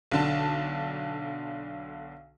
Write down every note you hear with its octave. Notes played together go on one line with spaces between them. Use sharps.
B1 D3 A5